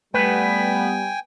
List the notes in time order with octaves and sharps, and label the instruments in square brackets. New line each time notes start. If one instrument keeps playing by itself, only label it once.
[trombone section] G3 [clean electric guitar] A3 B4 [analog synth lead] B3 [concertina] G5 G#5